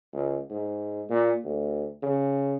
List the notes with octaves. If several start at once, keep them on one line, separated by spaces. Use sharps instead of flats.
C#2
G#2
A#2
D2
C#3